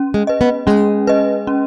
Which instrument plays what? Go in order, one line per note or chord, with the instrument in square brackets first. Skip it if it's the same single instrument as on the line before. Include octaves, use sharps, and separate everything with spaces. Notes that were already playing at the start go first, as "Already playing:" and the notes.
Already playing: [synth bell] C#4
[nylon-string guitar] G#3
[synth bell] B4 D#5
[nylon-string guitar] B3
[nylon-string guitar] G#3 [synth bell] C#4
[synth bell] B4 D#5
C#4